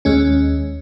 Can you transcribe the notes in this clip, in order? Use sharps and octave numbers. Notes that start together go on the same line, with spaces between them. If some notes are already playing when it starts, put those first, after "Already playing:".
D#2 G#3 C#4